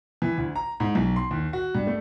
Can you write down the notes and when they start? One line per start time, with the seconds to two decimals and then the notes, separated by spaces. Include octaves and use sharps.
0.22 E3
0.38 D2
0.56 A#5
0.80 G#2
0.95 B1
1.16 C6
1.31 D#2
1.53 F#4
1.75 G2
1.87 A3